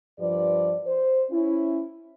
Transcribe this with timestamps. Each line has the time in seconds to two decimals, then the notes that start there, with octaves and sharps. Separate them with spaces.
0.20 G2 F3 G4 B4 D5
0.87 C5
1.31 C#4 E4